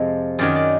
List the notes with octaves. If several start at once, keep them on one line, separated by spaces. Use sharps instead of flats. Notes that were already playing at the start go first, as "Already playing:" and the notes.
Already playing: F2 C3 F3 G#3 C5
F#2 D#3 F#3 D5
D5